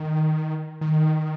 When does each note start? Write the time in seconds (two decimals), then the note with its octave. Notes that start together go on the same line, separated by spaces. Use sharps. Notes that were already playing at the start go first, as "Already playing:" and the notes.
Already playing: D#3
0.81 D#3